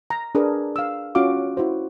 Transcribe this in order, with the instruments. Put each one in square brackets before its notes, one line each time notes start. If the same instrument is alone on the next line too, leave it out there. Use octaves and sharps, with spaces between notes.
[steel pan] A#5
D4 G#4 A#4 B4
F5 E6
C#4 F4 F#4 F5 D6
E4 F#4 C5